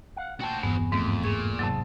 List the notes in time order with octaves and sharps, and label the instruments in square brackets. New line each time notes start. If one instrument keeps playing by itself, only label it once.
[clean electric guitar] F5 F#5
[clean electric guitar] A#2 G5 A5 [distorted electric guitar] F#4 C5
[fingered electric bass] E1 G2 E3 [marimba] B3 [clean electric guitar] G#4
[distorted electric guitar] F2 [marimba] G#2 [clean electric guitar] A3
[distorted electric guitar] A#2 [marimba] G#4 C#6
[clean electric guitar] G#2 G#3 A5 [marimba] C3 F#3